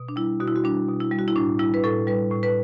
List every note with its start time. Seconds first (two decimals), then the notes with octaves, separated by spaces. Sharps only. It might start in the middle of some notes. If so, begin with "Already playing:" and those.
Already playing: B2
0.09 D4
0.16 G3 E4
0.40 B2 F#4
0.48 E4
0.56 F#4
0.64 G3 D4
0.89 B2
1.00 E4
1.11 G3
1.19 F#4
1.28 E4
1.36 A2 D4
1.59 G3 E4
1.74 B4
1.84 A2 A4
2.07 G3 B4
2.31 A2
2.43 B4